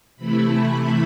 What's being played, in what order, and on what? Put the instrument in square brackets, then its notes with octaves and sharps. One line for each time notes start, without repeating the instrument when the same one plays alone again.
[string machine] C3 E3 A3 E4 B5